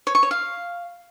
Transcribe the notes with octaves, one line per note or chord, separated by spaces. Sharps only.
C#5
C#6
C#5
F5